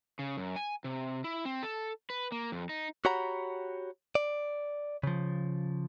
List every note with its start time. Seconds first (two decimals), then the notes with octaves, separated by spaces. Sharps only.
0.19 C#3
0.38 F#2
0.56 G#5
0.84 C3
1.24 E4
1.45 C4
1.63 A4
2.10 B4
2.32 A#3
2.52 F2
2.69 D#4
3.05 F#4 G4 C#5 F#5 A#5 B5
4.15 D5
5.03 C#3 F3